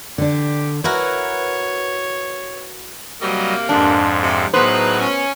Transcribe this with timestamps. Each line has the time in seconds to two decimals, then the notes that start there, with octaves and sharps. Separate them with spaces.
0.18 D3 D4 G4
0.84 E4 F#4 A#4 B4 C#5
3.21 C3 F#3 G3 A#3 D#5
3.69 F2 G#2 D4
4.23 C3
4.53 A2 F#3 B3 D#4 G#4 B4 C5
4.99 C#4